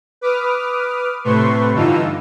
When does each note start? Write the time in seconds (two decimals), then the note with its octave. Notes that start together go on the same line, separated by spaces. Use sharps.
0.21 B4 D6 D#6 F6
1.24 A2 C3 A3 B4 C6 C#6
1.73 G2 D3 E3 D#4 F4 E6